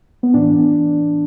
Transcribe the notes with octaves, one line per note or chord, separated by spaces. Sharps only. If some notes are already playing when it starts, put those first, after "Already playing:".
B3
A2 E3 D4